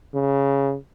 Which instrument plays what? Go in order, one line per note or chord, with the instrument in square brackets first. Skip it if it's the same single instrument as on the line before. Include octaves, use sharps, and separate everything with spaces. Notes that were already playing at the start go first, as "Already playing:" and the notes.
[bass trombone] C#3